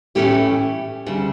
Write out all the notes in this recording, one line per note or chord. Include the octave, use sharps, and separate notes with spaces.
A2 E3 A3 C#4 E4 G4
D2 C#3 G3